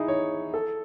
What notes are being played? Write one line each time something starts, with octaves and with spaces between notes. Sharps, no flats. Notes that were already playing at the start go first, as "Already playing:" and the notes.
Already playing: D#4 E4 G#4
C#5
A4